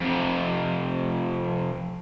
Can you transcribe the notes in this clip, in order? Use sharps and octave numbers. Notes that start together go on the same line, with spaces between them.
F2 C3